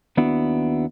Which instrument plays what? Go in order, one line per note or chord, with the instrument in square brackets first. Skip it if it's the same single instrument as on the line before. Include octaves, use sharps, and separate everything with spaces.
[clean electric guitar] D#2 B3 D4 E4 F#4